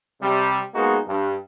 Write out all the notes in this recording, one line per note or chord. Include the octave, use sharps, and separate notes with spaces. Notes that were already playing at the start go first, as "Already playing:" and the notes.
C3 G3
G#3 A#3 B3 D#4 F#4 G#4
G2